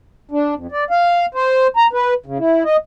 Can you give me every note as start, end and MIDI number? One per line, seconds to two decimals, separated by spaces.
0.31 0.54 62
0.55 0.67 41
0.72 0.84 74
0.90 1.26 77
1.34 1.67 72
1.76 1.87 82
1.93 2.14 71
2.26 2.38 49
2.39 2.63 64
2.64 2.77 75